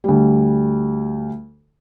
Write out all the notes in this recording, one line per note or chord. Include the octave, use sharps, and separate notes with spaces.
D2 G3